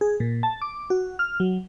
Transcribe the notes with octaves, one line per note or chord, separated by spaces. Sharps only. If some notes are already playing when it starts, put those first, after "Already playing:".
G#4
A#2
A5
D6
F#4
F6
F#3